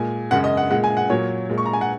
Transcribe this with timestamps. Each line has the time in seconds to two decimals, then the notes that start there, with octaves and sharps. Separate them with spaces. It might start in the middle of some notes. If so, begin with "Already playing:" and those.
Already playing: A#2 G#3 G#5
0.31 F#2 C#3 G#3 F#5
0.44 D#5
0.57 F#5
0.70 A#2 G#3 F#5
0.84 G#5
0.97 F#5
1.10 A#2 F#3 C#5
1.49 A#2 G#3
1.58 C#6
1.66 A#5
1.73 G#5
1.81 F#5